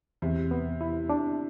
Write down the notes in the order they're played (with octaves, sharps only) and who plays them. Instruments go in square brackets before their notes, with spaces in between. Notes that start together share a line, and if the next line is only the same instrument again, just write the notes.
[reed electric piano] E2 [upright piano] C3
[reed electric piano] B3
E4
D4